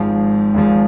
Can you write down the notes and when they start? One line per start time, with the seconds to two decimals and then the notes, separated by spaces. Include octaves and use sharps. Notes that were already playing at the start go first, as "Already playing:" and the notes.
Already playing: G#1 G#2 F3
0.54 G#1 G#2 F3